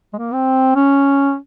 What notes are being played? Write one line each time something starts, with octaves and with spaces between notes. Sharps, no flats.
G#3
A#3
C4
C#4